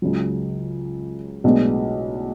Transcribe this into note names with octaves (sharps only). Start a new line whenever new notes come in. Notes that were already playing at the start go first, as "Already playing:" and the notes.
C#2 C#3 F#3
B1 A2 G#3 B3 D4